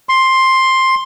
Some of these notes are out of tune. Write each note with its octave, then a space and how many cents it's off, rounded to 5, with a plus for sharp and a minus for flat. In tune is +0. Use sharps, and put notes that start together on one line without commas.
C6 +10